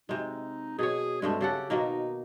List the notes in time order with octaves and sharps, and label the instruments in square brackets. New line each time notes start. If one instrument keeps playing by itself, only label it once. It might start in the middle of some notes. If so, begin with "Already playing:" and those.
[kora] C3 G#3 [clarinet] D#4
[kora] B2 C#5 [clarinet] G#4
[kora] G2 C3 A3 [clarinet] G#3
[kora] C#3 A4 F#5 [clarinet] G4
[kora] B2 D#3 A#3 [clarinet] D#4